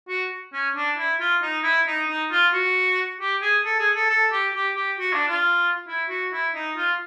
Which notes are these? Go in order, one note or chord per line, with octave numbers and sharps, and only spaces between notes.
F#4
C#4
D4
E4
F4
D#4
E4
D#4
D#4
F4
F#4
G4
G#4
A4
G#4
A4
A4
G4
G4
G4
F#4
D4
F4
E4
F#4
E4
D#4
F4